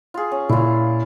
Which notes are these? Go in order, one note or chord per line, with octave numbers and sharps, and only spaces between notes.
F4 G#4
C#4
A#2 E4 F4